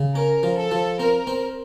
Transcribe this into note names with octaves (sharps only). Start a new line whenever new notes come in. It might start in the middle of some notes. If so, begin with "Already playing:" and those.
Already playing: C#3
C#4 A#4
F3
A4
F3
C4 A#4
C4